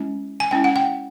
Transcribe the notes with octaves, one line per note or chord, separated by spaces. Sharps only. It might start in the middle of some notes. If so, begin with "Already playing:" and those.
Already playing: G#3 C#4 E4
G#5
G#3 C#4 E4 G5
F#5
G5